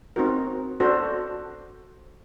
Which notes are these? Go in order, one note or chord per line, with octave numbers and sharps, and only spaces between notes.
C4 D#4 F#4 A#4
D4 F#4 A4 C5